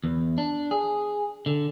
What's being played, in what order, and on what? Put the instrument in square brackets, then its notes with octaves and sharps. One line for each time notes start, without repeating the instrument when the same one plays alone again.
[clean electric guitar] E2
D4
G#4
D3